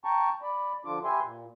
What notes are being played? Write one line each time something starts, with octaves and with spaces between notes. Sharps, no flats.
G5 A5 A#5 C#6
D5 B5
D3 F3 D4 F4 D6
G4 B4 E5 G#5 C6
A#2